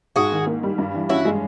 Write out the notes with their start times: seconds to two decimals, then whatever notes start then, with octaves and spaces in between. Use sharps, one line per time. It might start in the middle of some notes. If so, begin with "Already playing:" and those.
0.16 G#2 F#4 G#4
0.32 D#3
0.47 A#3
0.63 G3
0.78 G2
0.94 E3
1.09 C#4 E4 F#4
1.25 G#3